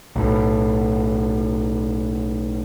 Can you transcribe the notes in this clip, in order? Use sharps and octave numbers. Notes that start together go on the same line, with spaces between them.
B1 A2